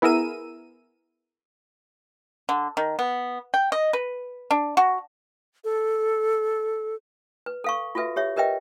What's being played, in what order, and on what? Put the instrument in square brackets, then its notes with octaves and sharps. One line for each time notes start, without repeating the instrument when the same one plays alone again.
[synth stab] B3 E4 G#4 A#4 E6 D#7
[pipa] D3
D#3
B3
G5
D#5
B4
D4
F#4
[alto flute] A4
[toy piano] B4
A4 F5 C#6
F4 F#4 A4 B4 E5
G4 C#5 E5
G4 A#4 B4 D#5 E5 G5